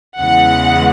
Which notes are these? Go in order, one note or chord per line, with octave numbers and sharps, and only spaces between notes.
E2 C#3 E3 G#3 F#5